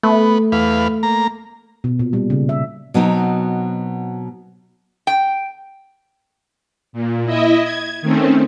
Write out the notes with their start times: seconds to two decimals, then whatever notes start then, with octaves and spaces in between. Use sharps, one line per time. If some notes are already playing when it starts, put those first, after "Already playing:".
0.03 A3 B3
0.52 E2 B4 F5
1.03 A#3 A#5
1.84 B2
1.99 A#2
2.13 G3
2.30 C#3
2.49 E5
2.94 B2 F#3 C4 D#4
5.07 G5
6.93 A#2
7.25 E4 D#5 E5
7.60 G#6
8.02 D#3 A3 C4 C#4